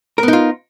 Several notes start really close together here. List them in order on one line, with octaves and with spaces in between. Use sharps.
A#4 B3 D#4 F4